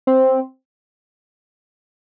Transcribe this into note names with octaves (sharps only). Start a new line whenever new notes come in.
C4